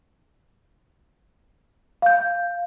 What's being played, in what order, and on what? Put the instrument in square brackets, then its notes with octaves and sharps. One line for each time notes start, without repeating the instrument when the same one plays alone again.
[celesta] F5 G6